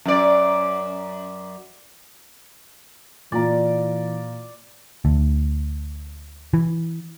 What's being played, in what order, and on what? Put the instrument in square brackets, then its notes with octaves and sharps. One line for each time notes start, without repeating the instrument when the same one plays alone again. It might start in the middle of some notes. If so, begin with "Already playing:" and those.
[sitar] F#2 D5
[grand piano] A#2 F4 A#5 [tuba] E3 [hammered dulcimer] D5
[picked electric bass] D2
E3